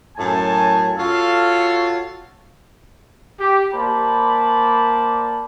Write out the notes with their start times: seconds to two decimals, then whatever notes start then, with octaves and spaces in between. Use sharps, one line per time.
0.17 F#2 A2 G#5 A5
0.98 F4 F#4 A4 C#5 F5
3.40 G4
3.74 A#3 C5 D5 A5 B5